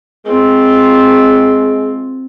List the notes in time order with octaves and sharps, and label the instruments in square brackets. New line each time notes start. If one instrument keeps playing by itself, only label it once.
[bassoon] G#3 [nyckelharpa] C4 F4